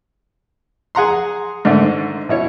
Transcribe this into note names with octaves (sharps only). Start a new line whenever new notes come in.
G#4 F#5 A#5 C6
G#2 D3 D#3 A3
B2 E4 C#5